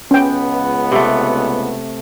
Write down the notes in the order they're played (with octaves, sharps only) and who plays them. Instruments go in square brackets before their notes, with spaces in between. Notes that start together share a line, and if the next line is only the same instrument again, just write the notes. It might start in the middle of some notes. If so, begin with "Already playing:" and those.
[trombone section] C#2 B3 [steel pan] C#4 G5
[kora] C3 A3